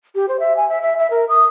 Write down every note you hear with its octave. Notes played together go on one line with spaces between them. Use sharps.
G4
C5
E5
G#5
E5
E5
E5
A#4
D#6